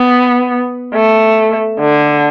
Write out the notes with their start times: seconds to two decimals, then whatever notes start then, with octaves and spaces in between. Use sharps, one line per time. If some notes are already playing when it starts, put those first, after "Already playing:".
Already playing: B3
0.95 A3
1.80 D3